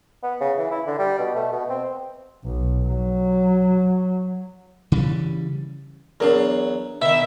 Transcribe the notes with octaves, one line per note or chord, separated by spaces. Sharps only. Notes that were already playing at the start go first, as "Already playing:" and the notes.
B3
C#3
E3
E4
D3
G3
B2
A3
B2
C4
B1
F#3
C#3 E3 G3
E2 F#3 D4 A#4
B2 D#3 E5